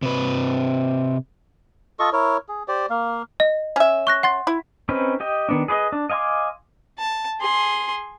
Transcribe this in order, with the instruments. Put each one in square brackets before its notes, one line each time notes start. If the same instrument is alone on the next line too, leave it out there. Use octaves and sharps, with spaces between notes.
[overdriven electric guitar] C3 B4
[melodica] F4 A4 D#5 C#6
E4 A#4 C#5
G#4
G4 C5 D5
A#3 F5
[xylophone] D#5
[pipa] C#4 E5
[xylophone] C#6 F#6 A#6
F#5 C6 A6
[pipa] E4
[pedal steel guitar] C4 C#4 D#4 B4
G4 D#5 G5
D#3 B3 D4
G#4 B4 D5 D#5
D4
D#5 F5 G#5 C6 D6
[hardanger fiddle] A5
G#4 C6